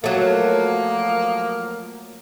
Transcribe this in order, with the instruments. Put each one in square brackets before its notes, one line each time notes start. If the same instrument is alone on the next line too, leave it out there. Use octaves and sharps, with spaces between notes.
[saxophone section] F3 A#3 [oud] F#3 A3